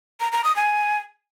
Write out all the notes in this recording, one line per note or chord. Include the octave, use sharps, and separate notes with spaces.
A#5
A#5
D#6
G#5